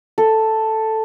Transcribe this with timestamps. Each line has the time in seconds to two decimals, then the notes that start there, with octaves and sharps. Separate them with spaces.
0.18 A4